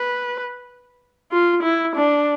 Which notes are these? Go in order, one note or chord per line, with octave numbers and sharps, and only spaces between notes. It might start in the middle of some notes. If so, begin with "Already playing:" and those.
Already playing: B4
F4
E4
D4